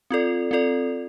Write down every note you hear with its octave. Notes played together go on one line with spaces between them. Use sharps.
C4 F4 A4 D5
C4 F4 A4 D5